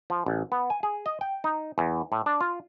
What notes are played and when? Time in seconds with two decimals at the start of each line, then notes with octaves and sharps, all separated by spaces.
0.10 F3
0.26 A1
0.52 B3
0.70 G#5
0.83 G#4
1.06 D#5
1.21 G5
1.44 D#4
1.78 E2
2.12 A2
2.26 D4
2.41 F4